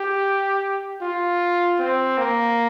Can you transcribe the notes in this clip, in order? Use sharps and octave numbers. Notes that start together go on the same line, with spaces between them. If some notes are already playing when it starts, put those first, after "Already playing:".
Already playing: G4
F4
C4
A#3